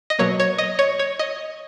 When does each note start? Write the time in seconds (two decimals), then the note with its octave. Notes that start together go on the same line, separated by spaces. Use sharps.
0.10 D#5
0.19 B2 F#3 A#3 C#5
0.40 C#5
0.58 D#5
0.79 C#5
0.99 C#5
1.19 D#5